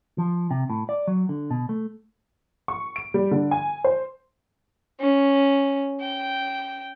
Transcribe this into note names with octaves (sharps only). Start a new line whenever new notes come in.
F3
C3
A2
D5
F#3
D3
B2
A3
C#6
D7
G3
D3
G#5
C5
C#4
G5